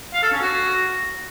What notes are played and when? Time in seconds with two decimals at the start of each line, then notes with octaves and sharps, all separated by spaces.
0.13 F5
0.22 A4
0.32 C#4
0.41 F#4